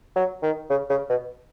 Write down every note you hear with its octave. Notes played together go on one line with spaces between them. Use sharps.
F#3
D#3
C#3
C#3
B2